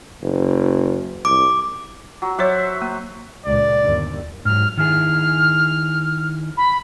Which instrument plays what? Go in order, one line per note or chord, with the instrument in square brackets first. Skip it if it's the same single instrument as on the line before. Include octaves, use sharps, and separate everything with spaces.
[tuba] F#1
[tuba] C2 [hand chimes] D6
[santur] F#3
[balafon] F#3 C#5 [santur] C5 E5 F#5
[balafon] A#3
[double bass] C#2 A#2 [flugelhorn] D5
[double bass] G1 D#2
[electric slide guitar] G#2 F#3 [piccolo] F6
[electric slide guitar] D#3 E4 G#4 [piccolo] F6
[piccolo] B5